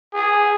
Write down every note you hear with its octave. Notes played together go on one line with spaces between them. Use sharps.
G#4